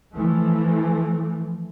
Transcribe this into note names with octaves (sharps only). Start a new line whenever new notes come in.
E3 F3 A3